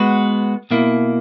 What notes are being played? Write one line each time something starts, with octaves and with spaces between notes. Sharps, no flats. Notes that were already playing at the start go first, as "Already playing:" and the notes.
Already playing: G#3 B3 F#4 B4
B2 A#3 E4